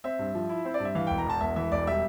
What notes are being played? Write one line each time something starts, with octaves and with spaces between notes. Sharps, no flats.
C4 E5
G2
F3
E4
C4
D5
G2 E5
E3 F5
E1 G5
A#5
E2 A5
E1 E5
E3 E5
E1 D5
G3 E5